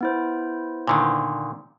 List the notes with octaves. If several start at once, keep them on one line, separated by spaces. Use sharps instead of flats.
B3 E4 C5
A#2 D3 D#3